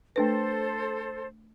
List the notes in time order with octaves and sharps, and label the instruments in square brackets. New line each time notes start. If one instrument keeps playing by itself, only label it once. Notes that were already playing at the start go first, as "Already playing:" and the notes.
[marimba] A3 D4 B4 [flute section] A4 C5